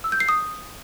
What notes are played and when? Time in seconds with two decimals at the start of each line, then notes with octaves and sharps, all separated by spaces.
0.04 E6
0.12 G6
0.20 C7
0.29 D#6